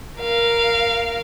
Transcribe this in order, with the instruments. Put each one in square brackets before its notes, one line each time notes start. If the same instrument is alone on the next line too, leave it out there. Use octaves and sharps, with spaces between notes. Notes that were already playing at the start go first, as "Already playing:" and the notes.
[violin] A#4 F5